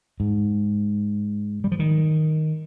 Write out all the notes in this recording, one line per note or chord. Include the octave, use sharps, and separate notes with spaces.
G#2
G3
F3
D#3